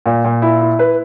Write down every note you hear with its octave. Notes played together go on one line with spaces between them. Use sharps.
A#2
A#2
E4
E4
B4